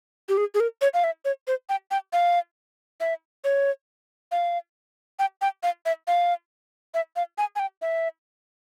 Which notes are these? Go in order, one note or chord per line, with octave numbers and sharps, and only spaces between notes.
G4
G#4
G#4
A#4
C#5
F5
E5
C#5
C5
G5
G5
F5
E5
C#5
F5
G5
G5
F5
E5
F5
E5
F5
G#5
G#5
G5
E5